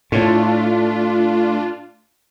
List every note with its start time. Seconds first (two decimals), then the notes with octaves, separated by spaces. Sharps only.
0.12 A2 A3 D4 F4